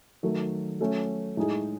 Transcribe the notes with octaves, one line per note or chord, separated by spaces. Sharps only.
D#3 F#3 A3
F#3 A3 C#4
A2 G#3 D#4 G#4